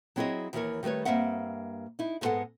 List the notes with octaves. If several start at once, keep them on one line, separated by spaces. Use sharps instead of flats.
F#3 C4 E4 G#4 C#5 D#5
D#2 E3 E4 A4 A#4 C#5
D#3 G3 A3 B4 C#5
G2 A3 A#3 C4 E5 F#5
D#4 E4
G#2 G3 G#3 B3 A4 F#5